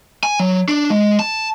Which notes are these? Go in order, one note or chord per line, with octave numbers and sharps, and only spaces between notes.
G#5
F#3
D4
G#3
A5